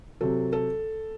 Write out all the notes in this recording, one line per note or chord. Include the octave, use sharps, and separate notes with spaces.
C3 F#3 A4
A4